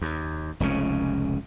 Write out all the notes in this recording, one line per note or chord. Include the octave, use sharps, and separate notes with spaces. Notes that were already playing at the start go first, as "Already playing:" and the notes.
D#2
F1 C#2 C#3 C#4